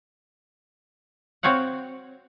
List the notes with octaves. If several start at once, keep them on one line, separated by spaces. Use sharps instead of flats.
C4 F#4 C#5 F5 F#5